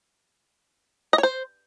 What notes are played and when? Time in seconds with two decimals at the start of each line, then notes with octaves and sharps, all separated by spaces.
1.13 D#5
1.18 C#5
1.23 C5